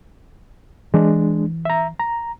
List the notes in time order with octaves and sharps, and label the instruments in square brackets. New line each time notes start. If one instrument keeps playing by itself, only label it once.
[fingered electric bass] E3 [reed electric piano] G#3 D4
[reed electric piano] E5 A#5
A#5